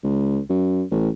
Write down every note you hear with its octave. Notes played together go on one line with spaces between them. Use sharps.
C#2
F#2
A1